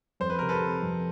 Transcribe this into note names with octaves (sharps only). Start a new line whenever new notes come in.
F2 C5
B4
C3 A#4
A4 B4
C3
F2